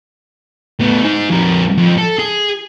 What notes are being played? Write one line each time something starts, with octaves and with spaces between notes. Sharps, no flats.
A2 B3
D#4 G#4
F2 A#4
F2
A4
G#4